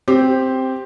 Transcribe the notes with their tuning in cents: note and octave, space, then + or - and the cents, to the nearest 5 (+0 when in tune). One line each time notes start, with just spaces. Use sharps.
C4 +0 G4 +0